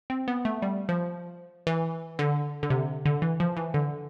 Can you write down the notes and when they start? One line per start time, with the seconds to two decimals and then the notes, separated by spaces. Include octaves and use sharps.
0.10 C4
0.28 B3
0.45 A3
0.62 G3
0.89 F3
1.67 E3
2.19 D3
2.63 D3
2.70 C3
3.05 D3
3.22 E3
3.40 F3
3.57 E3
3.74 D3